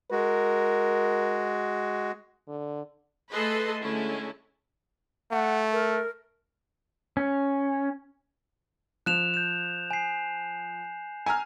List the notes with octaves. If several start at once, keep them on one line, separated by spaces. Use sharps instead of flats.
G#3 F#4 A#4
D3
A3 G#4 A4 B4 D#5 C6
D3 G#3 A3 C#4 E4
A3 F#5
A#4
C#4
F3 F#6 E7 F7
G6 E7
G#5 C7
G#5 A#5 F6